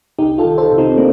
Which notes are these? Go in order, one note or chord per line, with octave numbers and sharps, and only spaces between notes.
C2 D#4 G4
F4 A4
D#3
A4 C5
C3
C4 D#4
A#3 D4